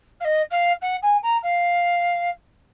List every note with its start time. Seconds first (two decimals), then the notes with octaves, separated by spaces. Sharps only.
0.20 F5
0.24 D#5
0.50 F5
0.81 F#5
1.02 G#5
1.23 A#5
1.42 F5